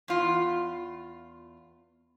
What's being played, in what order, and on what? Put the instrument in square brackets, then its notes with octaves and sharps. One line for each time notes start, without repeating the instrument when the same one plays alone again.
[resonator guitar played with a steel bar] E2 F4